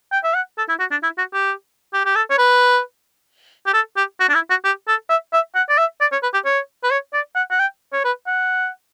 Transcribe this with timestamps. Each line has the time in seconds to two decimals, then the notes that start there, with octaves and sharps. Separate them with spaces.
0.12 G5
0.24 E5
0.34 F#5
0.58 A4
0.69 E4
0.79 F#4
0.91 D4
1.03 E4
1.18 F#4
1.33 G4
1.94 G4
2.05 G4
2.15 A4
2.30 C#5
2.38 B4
3.66 G4
3.73 A4
3.96 G4
4.20 F#4
4.29 D4
4.34 E4
4.50 F#4
4.64 G4
4.88 A4
5.09 E5
5.33 E5
5.55 F#5
5.69 D5
5.78 E5
6.01 D5
6.12 C#5
6.23 B4
6.34 G4
6.45 C#5
6.83 B4
6.91 C#5
7.13 D5
7.35 F#5
7.51 F#5
7.59 G5
7.93 C#5
8.04 B4
8.27 F#5